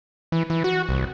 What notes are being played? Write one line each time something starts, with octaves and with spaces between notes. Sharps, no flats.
E3
E3
F#4
C2